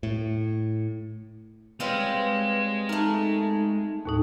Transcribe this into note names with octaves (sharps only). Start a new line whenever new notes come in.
A2
G3 G#3 C4 F4 B4 C#5 D#5
A3 D#4 A#4 A5
D#2 A2 D#4